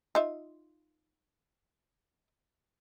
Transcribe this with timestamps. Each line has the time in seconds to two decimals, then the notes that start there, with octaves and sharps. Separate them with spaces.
0.15 D#4 F4 E5